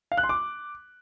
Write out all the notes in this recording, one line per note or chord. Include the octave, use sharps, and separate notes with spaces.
F5
F#6
C6
D6